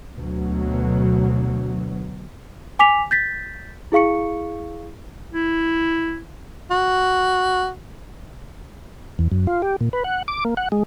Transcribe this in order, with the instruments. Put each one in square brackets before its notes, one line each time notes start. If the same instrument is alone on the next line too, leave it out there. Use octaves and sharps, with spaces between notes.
[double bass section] D2 B2 F#3
[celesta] G#5 D6 B6 F7
G6 A6 B6
E4 G#4 F5 C#6 C#7
[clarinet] E4
[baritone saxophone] F#4
[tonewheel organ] E2
F#2
F4
G4
A#2
B4
F#5
D6
A#3
F#5
G#3